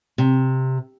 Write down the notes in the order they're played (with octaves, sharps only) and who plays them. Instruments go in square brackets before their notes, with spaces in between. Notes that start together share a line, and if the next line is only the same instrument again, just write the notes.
[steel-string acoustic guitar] C3